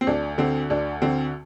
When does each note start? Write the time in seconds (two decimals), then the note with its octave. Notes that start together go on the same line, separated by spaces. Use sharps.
0.01 C4
0.07 D2 D4
0.38 D3 C4
0.70 D2 D4
1.02 D3 C4